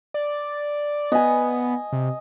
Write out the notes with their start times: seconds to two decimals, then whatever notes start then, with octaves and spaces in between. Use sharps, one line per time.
0.14 D5
1.12 B3 D#5 G#5
1.92 C3